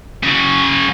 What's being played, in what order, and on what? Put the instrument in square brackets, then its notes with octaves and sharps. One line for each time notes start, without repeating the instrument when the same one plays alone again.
[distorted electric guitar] C#3 F#3